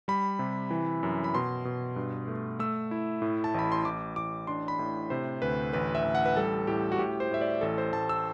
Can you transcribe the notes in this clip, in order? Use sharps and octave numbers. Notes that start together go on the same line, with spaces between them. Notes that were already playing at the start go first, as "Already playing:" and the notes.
G3 B5
C3
E3
F#2
B5
B2 C6
B2
G2
A3
A3 E6
E4
A2
A5
A1 B5
C6
A1 D6
A1 D6
D4 C6
B5
A2
C3 C5
D2 B4
A1 B4
E5
A1
F#5
B4
G3 A4
A2 G4
F#4
A2 G4
C5
A2 E5
D5
A1 A4
C5
A1 A5
E6